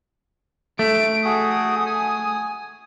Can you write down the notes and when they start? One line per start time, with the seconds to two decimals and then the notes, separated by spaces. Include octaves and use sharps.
0.79 A3 D7
1.25 F#4 G#4 A4 D#6
1.86 G#5